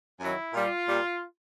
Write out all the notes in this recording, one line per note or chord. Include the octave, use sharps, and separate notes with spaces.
F#2 D#3 F#3 E4
A#2 G3 F4
A#2 G3